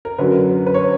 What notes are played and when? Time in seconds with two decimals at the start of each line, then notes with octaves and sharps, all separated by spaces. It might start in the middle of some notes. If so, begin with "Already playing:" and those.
0.05 A#4
0.18 F#2 D3 F#3 B4
0.66 B4
0.74 C#5